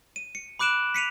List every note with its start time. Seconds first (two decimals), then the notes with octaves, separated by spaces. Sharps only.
0.16 D#7
0.35 C#7
0.59 B5 D6 F#6 D7 E7 F#7
0.94 B6 C#7 D#7 F7